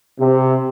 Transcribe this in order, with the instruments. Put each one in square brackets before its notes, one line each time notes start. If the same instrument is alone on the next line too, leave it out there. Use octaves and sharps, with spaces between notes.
[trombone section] C3